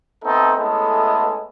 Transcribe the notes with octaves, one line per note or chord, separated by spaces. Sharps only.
A3 B3 C4 D#4 A4
G#3 A3 B3 C#4 E4 A4